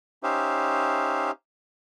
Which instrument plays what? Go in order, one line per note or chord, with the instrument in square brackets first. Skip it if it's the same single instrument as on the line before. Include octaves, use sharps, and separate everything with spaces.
[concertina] C#4 D#4 G4 C5 E5 F5